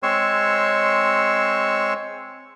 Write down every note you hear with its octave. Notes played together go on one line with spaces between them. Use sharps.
G#3 C4 C#5 C6 C#6 E6